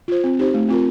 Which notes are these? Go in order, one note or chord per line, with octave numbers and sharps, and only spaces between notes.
F4 C5
C4
D#4 G4 C5
A3
C4 F4 A#4